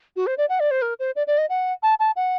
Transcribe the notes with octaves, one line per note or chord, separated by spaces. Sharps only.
F#4
C5
D5
F#5
D5
C5
A#4
C5
D5
D5
D#5
F#5
A5
A5
F#5